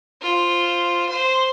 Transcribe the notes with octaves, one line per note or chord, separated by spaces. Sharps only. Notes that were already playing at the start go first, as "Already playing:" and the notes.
F4 C5
C5 C6